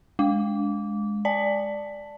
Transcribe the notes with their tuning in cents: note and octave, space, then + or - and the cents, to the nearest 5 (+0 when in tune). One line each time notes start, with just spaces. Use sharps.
G#3 +0 D6 -20
D5 +0 A5 +0